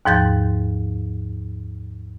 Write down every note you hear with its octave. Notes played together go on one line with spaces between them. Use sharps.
D#2 G#2 F3 G6 A6